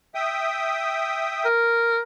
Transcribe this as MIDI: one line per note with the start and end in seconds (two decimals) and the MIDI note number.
0.15 1.48 76
0.15 1.48 79
0.15 1.48 87
1.45 2.01 70